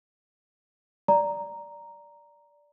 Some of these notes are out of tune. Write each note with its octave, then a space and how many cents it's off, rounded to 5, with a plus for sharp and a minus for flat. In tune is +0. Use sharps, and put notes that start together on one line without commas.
D5 -5 A#5 +0